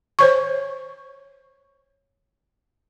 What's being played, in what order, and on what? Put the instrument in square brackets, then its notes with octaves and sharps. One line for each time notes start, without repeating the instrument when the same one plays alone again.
[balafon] C5 C#5 C#6